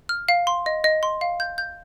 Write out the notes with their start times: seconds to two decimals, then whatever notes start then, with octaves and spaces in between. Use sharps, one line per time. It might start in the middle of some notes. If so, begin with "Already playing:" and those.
0.09 F6
0.29 F5
0.47 C6
0.66 D#5
0.84 D#5
1.03 C6
1.21 F5
1.40 G6
1.58 G6